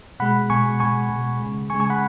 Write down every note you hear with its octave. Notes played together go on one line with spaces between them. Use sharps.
B2 G#3 F#5 B5
B2 G#3 G#5 C#6
B2 G#3 G#5 C#6
B2 G#3
C#3 G#3
C#3 G#3 G#5 C#6
G#5 C#6
F#5 B5